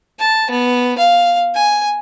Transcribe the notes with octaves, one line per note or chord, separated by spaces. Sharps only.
A5
B3
F5
G#5